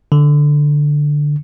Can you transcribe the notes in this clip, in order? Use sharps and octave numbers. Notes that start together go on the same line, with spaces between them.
D3